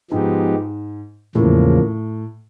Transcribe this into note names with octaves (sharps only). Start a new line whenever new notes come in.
G#2 F3 G#3 B3 D#4 G4
E2 A2 C#3 F3 A#3